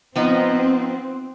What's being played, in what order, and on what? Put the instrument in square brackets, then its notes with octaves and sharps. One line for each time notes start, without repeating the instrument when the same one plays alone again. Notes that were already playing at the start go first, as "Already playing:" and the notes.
[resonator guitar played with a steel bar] F3 B3 D#4 [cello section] C4